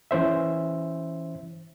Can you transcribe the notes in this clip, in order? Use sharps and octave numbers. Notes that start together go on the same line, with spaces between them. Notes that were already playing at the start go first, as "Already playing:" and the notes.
E3 C#4 C5 E5